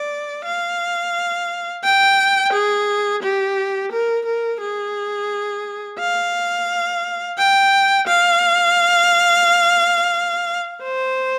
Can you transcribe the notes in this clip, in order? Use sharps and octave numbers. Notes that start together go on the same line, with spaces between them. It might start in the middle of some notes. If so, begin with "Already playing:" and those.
Already playing: D5
F5
G5
G#4
G4
A#4
A#4
G#4
F5
G5
F5
C5